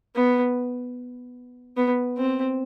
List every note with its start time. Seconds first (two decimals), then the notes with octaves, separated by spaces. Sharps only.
0.15 B3
1.77 B3
2.17 C4